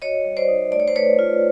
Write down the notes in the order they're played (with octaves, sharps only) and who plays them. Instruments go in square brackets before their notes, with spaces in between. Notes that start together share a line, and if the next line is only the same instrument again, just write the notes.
[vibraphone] F#4 C#5 D#5
G3
C5 D5
D#4
A3 D5
C#5
C5
A3 B4 C#5
F4